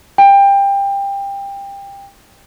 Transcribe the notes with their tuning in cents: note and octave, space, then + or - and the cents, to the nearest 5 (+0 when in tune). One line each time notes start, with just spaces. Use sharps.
G5 +20